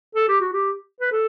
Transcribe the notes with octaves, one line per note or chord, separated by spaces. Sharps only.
A4
G4
F#4
G4
B4
A4